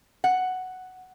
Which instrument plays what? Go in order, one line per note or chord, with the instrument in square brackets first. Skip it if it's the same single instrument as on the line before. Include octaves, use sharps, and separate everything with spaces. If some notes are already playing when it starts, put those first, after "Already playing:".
[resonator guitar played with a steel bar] F#5